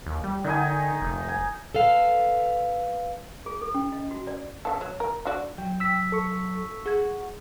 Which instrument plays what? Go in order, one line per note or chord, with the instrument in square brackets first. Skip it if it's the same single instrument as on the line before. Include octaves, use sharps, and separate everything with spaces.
[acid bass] D#2
G3
[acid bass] D3 [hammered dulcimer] D#3 D#4 G#5
[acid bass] F1
[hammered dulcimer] G#5
[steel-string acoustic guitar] A4 B4 F5
[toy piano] G#4
A4
C#4
D#5
F#4
D5
[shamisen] C#3 E3 A4
F#3
A#4
D3 F#4 D5
[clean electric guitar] F#3 [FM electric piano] G5
[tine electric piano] E6 B6
[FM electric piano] A4 C#6
[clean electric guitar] F#4 [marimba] G#4 G#6